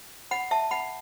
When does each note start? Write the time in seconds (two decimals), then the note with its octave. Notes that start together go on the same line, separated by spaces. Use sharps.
0.31 F#5 B5
0.51 E5 A5
0.71 F#5 B5